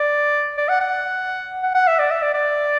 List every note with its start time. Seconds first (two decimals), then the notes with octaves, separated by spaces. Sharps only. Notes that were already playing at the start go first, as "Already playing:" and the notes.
Already playing: D5
0.58 D5
0.69 F#5
0.81 F#5
1.63 F#5
1.75 F#5
1.87 E5
1.99 D5
2.11 E5
2.22 D5
2.34 D5